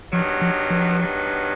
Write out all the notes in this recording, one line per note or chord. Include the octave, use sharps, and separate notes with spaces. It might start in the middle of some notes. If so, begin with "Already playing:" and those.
G2 D#3 F3 F#3 B3
F3
F3
G2 D#3 F#3 B3